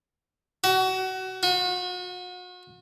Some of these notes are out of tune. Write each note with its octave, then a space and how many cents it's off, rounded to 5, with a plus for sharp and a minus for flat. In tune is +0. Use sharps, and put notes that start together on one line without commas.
F#4 +25
F#4 -40